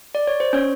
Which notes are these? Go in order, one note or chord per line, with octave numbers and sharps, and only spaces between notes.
D5
C#5
C5
C#4 C#5